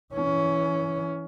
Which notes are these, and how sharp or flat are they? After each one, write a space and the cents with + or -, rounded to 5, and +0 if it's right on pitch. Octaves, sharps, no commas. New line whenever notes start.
E3 +0 C#4 +15